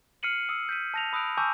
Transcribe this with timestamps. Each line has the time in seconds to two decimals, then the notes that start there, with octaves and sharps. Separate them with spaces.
0.23 F6 C7 C#7 D#7 F#7
0.49 D#6 E6 D#7
0.69 G6 B6 D#7
0.94 A5 A#6 F7
1.13 B5 D#6 E6 F#6 D7
1.37 G#5 A5 C#6 D6 E6 G6